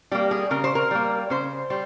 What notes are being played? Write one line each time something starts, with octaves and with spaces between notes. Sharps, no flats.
G3 A#3 G4
G#4
C#3 A#4
C5
A#4
G3 A#3
C#3 C5
G3 C5